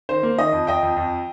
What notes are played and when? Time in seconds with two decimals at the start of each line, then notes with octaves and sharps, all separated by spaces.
0.09 D#3 C5
0.23 A#3
0.38 D#3 D#5
0.52 F2
0.67 F2 D#5 G5
0.83 F2
0.96 F2